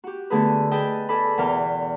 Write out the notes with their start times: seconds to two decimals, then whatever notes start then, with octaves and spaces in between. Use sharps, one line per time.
0.04 F#4 G4
0.30 D3 A3 B3 G#4 B4
0.71 G#4 B4 D#5 G5 A5
1.09 A4 D5 G#5 B5
1.38 E2 B2 E3 A#4 G5 F6